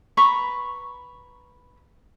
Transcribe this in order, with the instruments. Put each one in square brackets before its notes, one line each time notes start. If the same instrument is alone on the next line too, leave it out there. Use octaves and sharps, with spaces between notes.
[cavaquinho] B4 A#5 B5 C#6